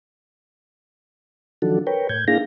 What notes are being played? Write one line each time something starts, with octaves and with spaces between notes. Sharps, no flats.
D#3 F3 F#3 D4 F#4 A4
A#4 B4 C#5 G5
A2 G6 G#6
A#3 D4 E4 G#4 F5 A#6